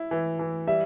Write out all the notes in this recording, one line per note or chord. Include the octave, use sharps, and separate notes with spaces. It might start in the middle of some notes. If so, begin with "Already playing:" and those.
Already playing: E4
E3
E3
G3 E5